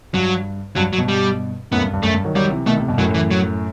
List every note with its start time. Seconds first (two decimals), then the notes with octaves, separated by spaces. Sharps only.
0.14 G2 F#3
0.76 G2 F#3
0.93 F#3
0.98 G2 B2
1.08 G3
1.72 F#2 A2 B3
1.82 G2
1.94 G2
2.03 F#2 A3
2.14 G2
2.25 D#3 F#3
2.35 D#3 F#3 G3
2.50 C3 E3
2.66 B2 D#3 A3
2.77 A2 C3
2.88 G2 B2
2.98 F#2 A2 F#3
3.14 E3
3.31 F#3